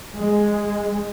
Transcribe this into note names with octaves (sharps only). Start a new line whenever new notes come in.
G#3